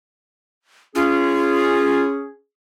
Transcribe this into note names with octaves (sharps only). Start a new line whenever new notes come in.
C#4 F4 G#4